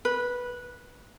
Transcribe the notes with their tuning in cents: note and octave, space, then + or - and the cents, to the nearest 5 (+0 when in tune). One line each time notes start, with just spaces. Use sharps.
B4 -10